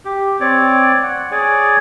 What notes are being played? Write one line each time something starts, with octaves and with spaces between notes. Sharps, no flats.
G4
C4 C#5 D5
F#5
G#4 C#5 D5 G#5